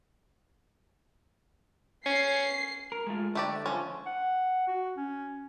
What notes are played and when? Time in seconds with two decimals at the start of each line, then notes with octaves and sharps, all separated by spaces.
2.06 C#4 C7
2.92 A#4
3.07 G#3 A3 F4
3.35 D3 A3 G4 D5
3.66 F3 C#4
4.06 F#5
4.67 F#4
4.97 C#4